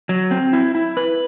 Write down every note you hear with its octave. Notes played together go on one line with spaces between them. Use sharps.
F#3
C4
E4
E4
B4